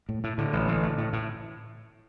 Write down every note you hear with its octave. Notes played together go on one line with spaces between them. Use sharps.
A2
A2
A2 D3
A1
A1
A2
A2
A2